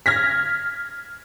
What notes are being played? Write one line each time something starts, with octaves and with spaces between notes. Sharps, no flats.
F6 G#6 A#6 B6